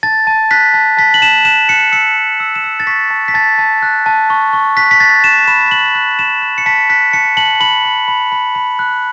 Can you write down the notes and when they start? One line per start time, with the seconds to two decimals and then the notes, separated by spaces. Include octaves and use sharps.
0.03 A5 A6
0.27 A5
0.51 F#6 B6
0.74 A5
0.97 A5 B6
1.14 F#7
1.22 A5 E7
1.45 F#6 E7
1.69 F#6 C#7
1.92 E6 C#7
2.17 A5
2.40 E6
2.55 E7
2.64 E6
2.80 A6
2.87 C#6 B6
3.11 A5
3.28 B6
3.34 A5 A6
3.58 A5
3.82 F#6
4.06 A5
4.30 C#6
4.53 C#6
4.77 F#6 B6
4.91 B6
5.00 F#6 A6
5.24 F#6 E7
5.47 B5 E7
5.71 F#6 F#7
5.95 F#6
6.19 F#6 E7
6.42 F#6
6.58 C#7
6.66 A5 B6
6.89 F#6 B6
7.13 A5 C#7
7.37 A5 F#7
7.60 B5 F#7
7.85 B5
8.08 B5
8.32 B5
8.55 B5
8.79 F#6